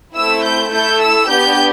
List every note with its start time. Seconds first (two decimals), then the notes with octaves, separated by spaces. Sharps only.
0.14 A3 C4 E4 E6
0.43 G6
0.71 A3 E4 A4 G6
1.00 E6
1.28 B3 D4 G4 G6